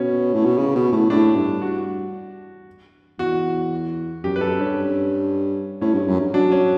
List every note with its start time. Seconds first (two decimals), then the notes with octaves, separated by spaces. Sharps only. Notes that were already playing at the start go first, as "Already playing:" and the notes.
Already playing: B2 C#4
0.34 A2
0.45 B2
0.58 C#3
0.75 B2
0.92 A2
1.10 A2 D4
1.36 G2
1.62 F#4
3.19 E2 F#4
4.24 F#2 G4
4.36 B4
4.41 F#2 A4
4.59 G2 C#4
5.81 A2 C#4
5.95 G2
6.08 F#2
6.20 G2
6.34 F#3 D4
6.52 C#4